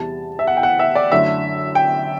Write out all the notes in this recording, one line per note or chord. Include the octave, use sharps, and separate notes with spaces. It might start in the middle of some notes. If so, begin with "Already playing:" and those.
Already playing: E2 C3 G3 A5
E5
F#5
G5
F#5
E5
D5
F#2 D3 A3 E4 E5
G5